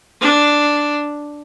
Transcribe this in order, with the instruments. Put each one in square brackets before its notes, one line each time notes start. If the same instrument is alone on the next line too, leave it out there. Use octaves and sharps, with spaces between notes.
[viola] D4